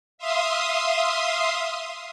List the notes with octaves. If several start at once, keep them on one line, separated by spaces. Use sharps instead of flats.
E5 F5 C6 D#6